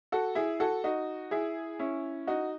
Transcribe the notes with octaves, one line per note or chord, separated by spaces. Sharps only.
F#4 A4
E4 G#4
F#4 A4
D#4 F#4
E4 G#4
C#4 E4
D#4 F#4